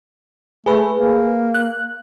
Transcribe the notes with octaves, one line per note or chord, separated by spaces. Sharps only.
A3 G#4 B4
A#3
F#6